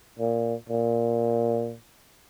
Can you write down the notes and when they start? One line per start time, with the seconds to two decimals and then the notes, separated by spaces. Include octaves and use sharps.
0.19 A#2
0.70 A#2